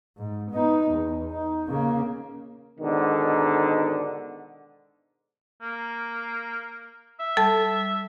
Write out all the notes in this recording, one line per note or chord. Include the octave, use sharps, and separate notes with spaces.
G#2
B3 D#4
E2
D#4
C#3 A#3
G#2 B2 D3 D#3
A#3
E5
G3 A4 A5